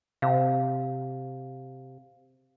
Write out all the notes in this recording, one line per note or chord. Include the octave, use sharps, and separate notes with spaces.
C3 F5